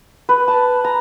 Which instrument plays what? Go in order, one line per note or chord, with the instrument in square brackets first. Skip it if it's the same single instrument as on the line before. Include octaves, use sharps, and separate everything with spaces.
[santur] B4
A5
A#5